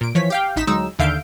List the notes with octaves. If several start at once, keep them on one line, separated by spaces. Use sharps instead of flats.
A#2 D7
E3 F3 C#5 B6
G4 F5 G5
A1 D#4 B6 E7
D2 F#3 G#3 D#4 E6
D#2 D3 E5 F5 G6 D7